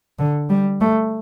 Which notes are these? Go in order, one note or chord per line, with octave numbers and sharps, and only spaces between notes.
D3
G3
A3